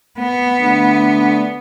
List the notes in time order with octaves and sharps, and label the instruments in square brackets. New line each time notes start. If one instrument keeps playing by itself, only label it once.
[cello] B3
[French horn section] D3 A3 D4